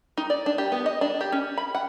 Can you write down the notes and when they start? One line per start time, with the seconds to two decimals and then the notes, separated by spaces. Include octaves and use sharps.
0.17 D#4
0.30 D5
0.46 D4
0.58 G4
0.72 B3
0.86 D#5
1.01 D4
1.21 G4
1.32 C#4
1.58 B5
1.75 F#5